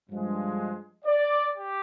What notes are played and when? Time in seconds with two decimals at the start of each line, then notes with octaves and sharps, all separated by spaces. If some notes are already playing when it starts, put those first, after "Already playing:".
0.10 G2 F3 G#3
1.05 D5
1.53 G4